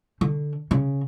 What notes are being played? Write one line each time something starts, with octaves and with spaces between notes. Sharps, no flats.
D3
C#3